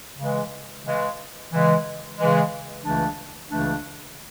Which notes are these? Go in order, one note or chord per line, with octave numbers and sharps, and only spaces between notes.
C#3 E3 G#3
C#3 E3 G#3
C#3 E3 G#3
C#3 E3 G#3
C#2 C#3 E3 A3 D4
C#2 C#3 E3 A3 D4